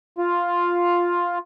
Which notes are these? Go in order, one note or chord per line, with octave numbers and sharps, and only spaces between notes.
F4